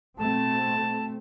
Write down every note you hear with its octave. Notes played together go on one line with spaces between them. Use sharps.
B2 A3 C4 A5